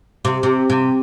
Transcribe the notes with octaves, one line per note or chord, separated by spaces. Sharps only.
C3
C3
C3